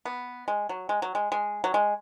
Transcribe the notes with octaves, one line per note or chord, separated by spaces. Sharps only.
B3
G#3
F#3
G#3
F#3
G#3
G#3
F#3
G#3